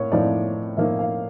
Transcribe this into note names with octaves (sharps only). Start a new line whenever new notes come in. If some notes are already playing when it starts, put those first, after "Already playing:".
Already playing: A2 A#3 C#5
A2 F3 A#3 D#4 D5
A2 F3 A#3 D#4 E5
F5